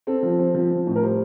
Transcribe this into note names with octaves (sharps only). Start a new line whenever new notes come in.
C4 A4
F3
C4
F3
F3
A2
A#4
G3 C5